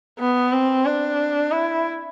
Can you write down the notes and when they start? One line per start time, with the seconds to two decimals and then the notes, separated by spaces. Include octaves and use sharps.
0.19 B3
0.52 C4
0.85 D4
1.52 E4